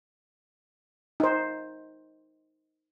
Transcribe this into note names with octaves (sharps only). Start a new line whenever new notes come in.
D#4 C5